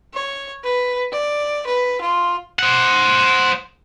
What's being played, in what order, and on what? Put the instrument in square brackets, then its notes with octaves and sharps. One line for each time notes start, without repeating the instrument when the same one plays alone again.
[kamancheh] C#5
B4
D5
B4
F4
[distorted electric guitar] C5 F#5